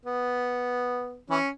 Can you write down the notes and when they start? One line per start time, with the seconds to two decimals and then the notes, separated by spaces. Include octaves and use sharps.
0.05 B3
1.30 E3 C#4